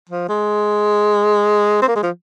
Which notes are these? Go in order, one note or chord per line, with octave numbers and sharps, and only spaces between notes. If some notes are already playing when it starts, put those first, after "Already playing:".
F3
G#3
C4
A#3
G#3
F3